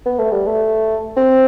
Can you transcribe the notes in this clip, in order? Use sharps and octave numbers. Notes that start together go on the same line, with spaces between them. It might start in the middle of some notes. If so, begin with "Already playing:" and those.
B3
A3
G3
A3
C4